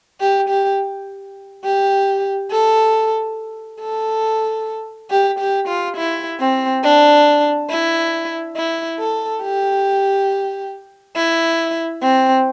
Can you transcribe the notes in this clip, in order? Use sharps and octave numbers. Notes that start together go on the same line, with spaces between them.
G4
G4
G4
A4
A4
G4
G4
F4
E4
C4
D4
E4
E4
A4
G4
E4
C4